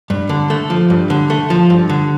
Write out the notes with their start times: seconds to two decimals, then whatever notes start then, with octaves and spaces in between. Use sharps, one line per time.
0.10 G2
0.29 D3
0.50 A3
0.70 F3
0.90 G2
1.10 D3
1.30 A3
1.50 F3
1.70 G2
1.89 D3